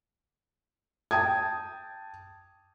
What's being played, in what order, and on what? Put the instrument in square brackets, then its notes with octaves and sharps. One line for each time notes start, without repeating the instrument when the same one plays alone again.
[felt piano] G5 A5 D#6 G#6